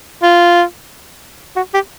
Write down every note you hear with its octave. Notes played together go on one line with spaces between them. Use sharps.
F4
F#4
G4